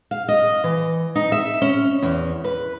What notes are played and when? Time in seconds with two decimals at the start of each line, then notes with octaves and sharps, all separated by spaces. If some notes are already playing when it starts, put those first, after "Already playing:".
0.11 F5
0.28 D#5
0.64 E3
1.15 D#4
1.32 E5
1.62 C#4
2.02 E2
2.44 B4